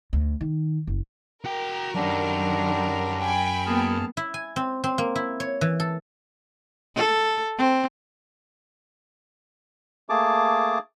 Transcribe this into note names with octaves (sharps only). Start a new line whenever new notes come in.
D2
D#3
F#1
F#4 A#4 G5
F#2 D3 D#3 F#3 G3 D4
G5 G#5 B5
A#3 B3 G#4 A5 F6
E4
G#5
C4
C4
A#3
E4
C#5
E3
A4
A4
C4
A3 A#3 G#4 A5 D6